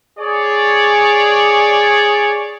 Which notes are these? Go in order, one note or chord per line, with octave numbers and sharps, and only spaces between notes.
G#4 C#5 D5